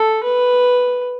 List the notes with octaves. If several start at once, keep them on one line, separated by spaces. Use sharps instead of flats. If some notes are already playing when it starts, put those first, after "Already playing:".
Already playing: A4
B4